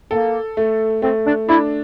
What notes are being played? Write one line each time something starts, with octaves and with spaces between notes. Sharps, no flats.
A#3 A4
A3
A3 C4
D4
D4 E4